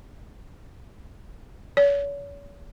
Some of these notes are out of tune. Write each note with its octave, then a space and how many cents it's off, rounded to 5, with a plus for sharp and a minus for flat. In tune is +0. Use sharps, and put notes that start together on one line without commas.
C#5 +40